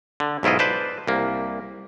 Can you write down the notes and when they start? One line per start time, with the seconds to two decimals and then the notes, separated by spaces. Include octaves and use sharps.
0.20 D3
0.43 B1 G#2 E4 F4 D#5
0.59 B4 C5 D5 A5
1.07 C2 A#3